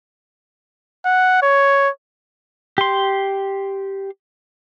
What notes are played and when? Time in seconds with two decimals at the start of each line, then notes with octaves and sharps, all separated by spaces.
1.05 F#5
1.42 C#5
2.78 G4 C6